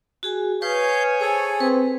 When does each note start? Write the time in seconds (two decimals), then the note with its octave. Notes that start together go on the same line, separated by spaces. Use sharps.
0.23 F#4 G#4 G#5
0.62 B4 C#5 F5 G#5 D#6 G6
1.21 G#4 A4 C5
1.60 C4 B4